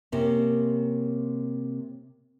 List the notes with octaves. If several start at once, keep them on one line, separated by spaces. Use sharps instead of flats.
C3 A#3 C#4